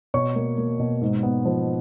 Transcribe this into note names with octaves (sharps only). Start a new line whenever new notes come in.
B2 C#5 C#6
A#3
A#3
B2
G#2
B3
F3